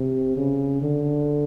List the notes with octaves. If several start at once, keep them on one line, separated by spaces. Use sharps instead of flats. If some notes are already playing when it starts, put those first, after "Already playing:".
Already playing: C3
C#3
D3